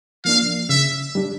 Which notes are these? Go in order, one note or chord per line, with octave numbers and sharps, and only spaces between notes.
F3 A#3 D4 F5
C#3 E5
G3 D4